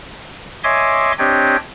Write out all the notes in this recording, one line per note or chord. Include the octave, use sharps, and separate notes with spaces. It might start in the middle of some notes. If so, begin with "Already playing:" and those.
C#5 D#5 E5 G#5 C6 D6
C4 D4 G4 C#5 D#5 G5